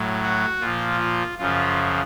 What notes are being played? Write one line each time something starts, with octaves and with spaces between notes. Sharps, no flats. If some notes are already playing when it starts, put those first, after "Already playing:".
Already playing: A2 F#3
F#4
A#2 F3 F4
F4
F#2 C#3 F3 F4